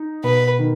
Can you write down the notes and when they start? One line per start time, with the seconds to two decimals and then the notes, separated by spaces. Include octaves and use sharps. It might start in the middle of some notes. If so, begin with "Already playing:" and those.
Already playing: D#4
0.24 B2 B4
0.59 D#3